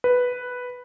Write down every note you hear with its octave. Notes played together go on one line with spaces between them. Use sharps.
B4